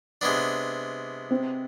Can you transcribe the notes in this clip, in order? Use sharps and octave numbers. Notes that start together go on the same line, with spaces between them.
C3 G#3 B3 D4
C4